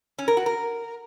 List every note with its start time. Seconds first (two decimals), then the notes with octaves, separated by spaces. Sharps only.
0.19 C#4
0.28 A#4
0.37 F#4
0.46 A#4